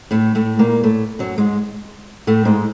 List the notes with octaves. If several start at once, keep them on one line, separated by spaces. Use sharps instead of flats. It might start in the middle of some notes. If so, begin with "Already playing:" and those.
A2 A3
A2 A3
A#2 A#3
A2 A3
F#2 F#3
G#2 G#3
A2 A3
G#2 G#3